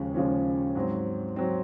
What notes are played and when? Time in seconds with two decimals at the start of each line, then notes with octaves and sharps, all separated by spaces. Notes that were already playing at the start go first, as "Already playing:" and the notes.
Already playing: D#2 C#3 F3 G#3 C#4
0.14 D#2 C#3 F3 G#3 C#4
0.75 G#2 F#3 C4
1.36 F#3 C4